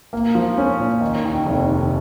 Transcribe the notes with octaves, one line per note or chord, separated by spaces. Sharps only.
A#3
F3
C#4
A#2
D#3
D#2
F1
F1